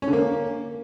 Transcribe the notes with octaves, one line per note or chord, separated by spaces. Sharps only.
C#4
D3
A#3